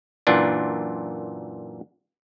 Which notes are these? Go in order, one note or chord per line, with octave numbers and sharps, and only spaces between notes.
F#2 A#2 E3 D4 F4